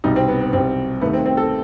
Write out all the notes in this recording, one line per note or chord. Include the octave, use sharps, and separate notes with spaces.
C2 B2 G3 D#4
C4
B3
B3
C2 B2 G3 C4
D#2 D#3 A3 B3
C4
C4
A4